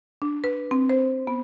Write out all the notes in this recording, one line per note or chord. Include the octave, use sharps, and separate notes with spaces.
D4
B4
C4
C5
B3